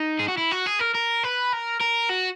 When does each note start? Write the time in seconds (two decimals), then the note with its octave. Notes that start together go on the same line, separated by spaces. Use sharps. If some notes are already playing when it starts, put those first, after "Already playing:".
Already playing: D#4
0.20 G#4
0.29 F#4
0.38 E4
0.52 F#4
0.67 G#4
0.80 A#4
0.95 A#4
1.24 B4
1.53 A#4
1.81 A#4
2.10 F#4